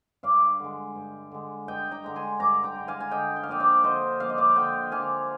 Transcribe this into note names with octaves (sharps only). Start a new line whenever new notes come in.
G2 D5 F5
D3 G#3
G2
D3 G#3
G2 D#5 G5
G5 A#5
D3 G#3 A#5
G#5 C6
G2 A#5 D6
G5 A#5
D3 G#3
F5 G#5
G#5
D3 D#5 G5
G5
F5
F3 A#3 D4 D#5 G5
D5 F5
D3 C5 D#5
F3 A#3 D4 F5
D#5
D5 F5
F5
D3 D#5 G5
F3 A#3 D4 F5 G#5